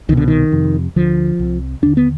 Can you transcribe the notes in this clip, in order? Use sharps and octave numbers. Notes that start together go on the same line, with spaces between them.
C2 B2 D#3
D3
D#3
F2 C3
D2 D3 F3
C2 C3
D#2 D3 D4
B3